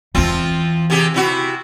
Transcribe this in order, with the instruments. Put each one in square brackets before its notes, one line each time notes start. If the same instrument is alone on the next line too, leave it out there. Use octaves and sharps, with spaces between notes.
[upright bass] E2 E3 [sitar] F3 C4 F4
[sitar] C3 G4 G#4
C3 E4 F#4